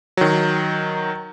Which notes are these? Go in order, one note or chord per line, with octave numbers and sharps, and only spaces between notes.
D#3 F#3